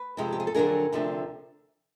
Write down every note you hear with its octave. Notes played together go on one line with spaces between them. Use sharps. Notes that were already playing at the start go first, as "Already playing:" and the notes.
Already playing: B4
F2 C3 F3 G#3 C4
G4
G#4
A4
F2 D3 F#3 B3 D4 G#4 A#4
D2 C3 F3 A3 D4